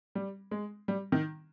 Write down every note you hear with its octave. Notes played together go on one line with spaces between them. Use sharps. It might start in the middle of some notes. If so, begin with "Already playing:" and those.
G3
G#3
G3
D#3